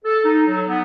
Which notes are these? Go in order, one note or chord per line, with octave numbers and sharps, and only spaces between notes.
A4
D#4
F#3
B3